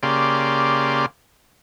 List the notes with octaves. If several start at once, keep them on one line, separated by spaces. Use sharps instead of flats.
C#3 A#3 G4 D5 C6